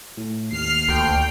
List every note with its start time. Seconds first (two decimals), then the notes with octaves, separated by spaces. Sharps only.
0.17 A2
0.52 D#2 F6 C7
0.88 D2 G5